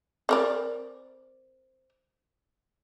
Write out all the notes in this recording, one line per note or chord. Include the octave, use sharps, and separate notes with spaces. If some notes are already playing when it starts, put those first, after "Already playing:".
C4 A#4 D5